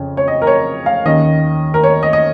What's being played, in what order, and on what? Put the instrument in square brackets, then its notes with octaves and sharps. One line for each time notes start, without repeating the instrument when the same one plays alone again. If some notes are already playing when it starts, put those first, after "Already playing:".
Already playing: [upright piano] F2 C#3 C#4
C#5
D#5
A#4
C#5
F5
D#2 D#3 C#4 D#5
A#4
C#5
D#5
D#5